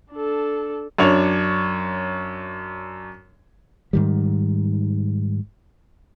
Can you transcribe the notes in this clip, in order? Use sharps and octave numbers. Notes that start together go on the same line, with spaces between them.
D4 A4
F#2 D4 C#5 F7
G#2 D#3 G3